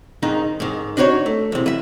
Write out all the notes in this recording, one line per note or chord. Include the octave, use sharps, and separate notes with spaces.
G#2 D#3 D#4
G#2 D#3
D4 D#4 F#4 B4 C#5
A3
E2 C3
E3 E5